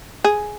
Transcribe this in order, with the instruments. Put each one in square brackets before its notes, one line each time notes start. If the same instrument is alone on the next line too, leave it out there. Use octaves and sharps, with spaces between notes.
[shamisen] G#4